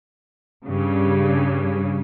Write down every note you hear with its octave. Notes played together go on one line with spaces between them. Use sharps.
G2 C#3